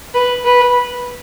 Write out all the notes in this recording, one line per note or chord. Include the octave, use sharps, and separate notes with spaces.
B4
B4